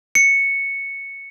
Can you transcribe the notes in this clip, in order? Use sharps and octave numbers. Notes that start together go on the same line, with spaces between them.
C#7